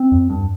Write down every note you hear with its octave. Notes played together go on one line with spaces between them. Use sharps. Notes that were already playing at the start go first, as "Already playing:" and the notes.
Already playing: C4
F2
G2